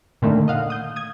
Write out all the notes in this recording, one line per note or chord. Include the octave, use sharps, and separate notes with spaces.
A#2 D3 D#3 A3 A#3
D#5 F5 F#5
D#6 G6
D#6 G#6